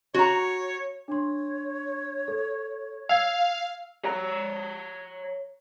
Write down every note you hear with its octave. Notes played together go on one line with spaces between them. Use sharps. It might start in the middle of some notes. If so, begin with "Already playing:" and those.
F#4 C#5 A#5
D4 C#5 C6
A4
F5 E6 G#6 C7
C#5 A#5